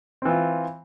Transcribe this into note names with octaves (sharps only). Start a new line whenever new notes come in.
E3 C4 F4